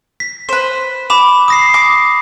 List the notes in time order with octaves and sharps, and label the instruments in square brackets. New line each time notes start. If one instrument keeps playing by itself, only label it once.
[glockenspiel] B6
[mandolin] B4 C5
[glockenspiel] B5 E7 [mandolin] D6
[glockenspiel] D#6 A#6 C7
[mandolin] D6